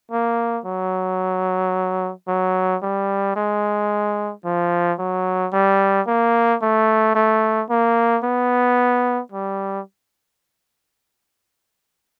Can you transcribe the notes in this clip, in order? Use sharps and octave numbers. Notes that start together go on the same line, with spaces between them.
A#3
F#3
F#3
G3
G#3
F3
F#3
G3
A#3
A3
A3
A#3
B3
G3